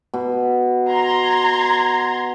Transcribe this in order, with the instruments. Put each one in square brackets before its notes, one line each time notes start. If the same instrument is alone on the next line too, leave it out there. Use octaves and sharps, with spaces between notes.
[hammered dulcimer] B2
[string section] A#5 C6 G#6